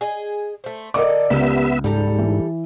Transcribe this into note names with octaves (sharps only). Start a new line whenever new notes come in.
G#4 D#5
A3 C5
D3 A4 A#4 D#5 D6
C#2 B3 G4 A#4 E5
G#2 G3 A4 A#5
E3